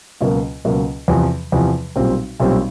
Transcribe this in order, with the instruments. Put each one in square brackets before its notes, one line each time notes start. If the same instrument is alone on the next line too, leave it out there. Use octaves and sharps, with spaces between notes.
[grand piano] C#2 B2 F#3 A#3
C#2 B2 F#3 A#3
E2 C3 F3
E2 C3 F3
B1 A#2 G3 C4
B1 A#2 G3 C4